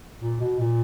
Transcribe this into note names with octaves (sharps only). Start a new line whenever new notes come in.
A#2
B2
A#2